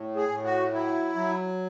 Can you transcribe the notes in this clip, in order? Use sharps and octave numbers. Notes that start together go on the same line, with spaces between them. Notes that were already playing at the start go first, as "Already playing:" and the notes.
Already playing: A2
G#4
A2
F#4
F#3 E4
F#3